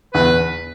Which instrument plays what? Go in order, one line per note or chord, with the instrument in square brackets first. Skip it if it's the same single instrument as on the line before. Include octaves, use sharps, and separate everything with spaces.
[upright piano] E2 [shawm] B4